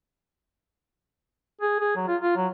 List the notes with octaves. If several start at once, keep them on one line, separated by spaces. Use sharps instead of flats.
G#4
G#4
F#3
F4
F4
F#3